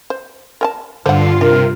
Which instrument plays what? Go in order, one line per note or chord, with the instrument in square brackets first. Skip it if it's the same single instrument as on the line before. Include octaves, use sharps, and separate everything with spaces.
[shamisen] C5
A#4 G#5 A5
[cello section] G2 F4 [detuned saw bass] D3 [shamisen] C5 F#5
[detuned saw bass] C3 [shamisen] D4 [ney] A#4